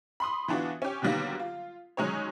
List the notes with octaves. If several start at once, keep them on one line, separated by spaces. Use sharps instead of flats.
B5 C6 D#6
E3 B3 D4 F4 F#4
C#4 G4
D3 D#3 F#3 G3 A#3 B3
F4
D#3 F#3 G#3 C#4 D#4 C#5